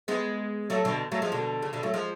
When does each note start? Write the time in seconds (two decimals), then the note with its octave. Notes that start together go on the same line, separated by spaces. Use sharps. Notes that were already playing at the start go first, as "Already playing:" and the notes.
0.08 G#3 B3
0.70 F#3 A3
0.85 B2 D3
1.12 F#3 A3
1.22 F3 G#3
1.32 B2 D3
1.62 C#3
1.73 B2 D3
1.83 F#3 A3
1.94 F3 G#3